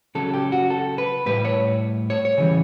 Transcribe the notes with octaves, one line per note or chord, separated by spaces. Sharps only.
C#3 F#3 A4
G4
F#4
A4
B4
A2 G3 B4
C#5
C#5
C#5
C#3 E3 G3